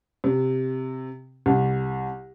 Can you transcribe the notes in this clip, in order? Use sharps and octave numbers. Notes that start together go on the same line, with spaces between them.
C3
C2